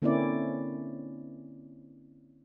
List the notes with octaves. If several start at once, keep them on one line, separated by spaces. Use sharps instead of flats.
D3 A#3 C4 C#4 E4 D5